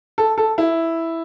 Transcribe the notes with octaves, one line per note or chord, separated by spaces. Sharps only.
A4
A4
E4